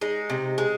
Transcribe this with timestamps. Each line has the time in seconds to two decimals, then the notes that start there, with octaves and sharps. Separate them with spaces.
0.01 G#3 D#4
0.30 C3
0.58 G#3